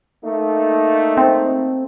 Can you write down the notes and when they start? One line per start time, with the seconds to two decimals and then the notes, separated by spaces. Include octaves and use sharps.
0.24 A3 A#3 D#4
1.17 C4